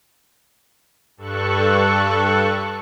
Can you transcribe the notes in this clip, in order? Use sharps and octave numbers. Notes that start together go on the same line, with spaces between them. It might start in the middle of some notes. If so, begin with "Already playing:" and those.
G2 A4 C#6 F#6